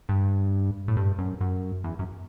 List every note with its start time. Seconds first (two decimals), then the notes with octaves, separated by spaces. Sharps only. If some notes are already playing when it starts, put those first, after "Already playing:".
0.09 G2
0.88 A2
0.97 G2
1.19 F#2
1.41 F#2
1.84 E2
1.99 F#2